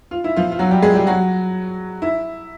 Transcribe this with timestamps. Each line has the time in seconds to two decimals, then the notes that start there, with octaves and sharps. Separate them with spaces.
0.11 F4
0.24 E4
0.36 F3 F4
0.52 F4
0.59 F#3 F#4
0.71 G3 G4
0.82 G#3 G#4
0.95 G3 G4
1.07 F#3 F#4
2.02 E4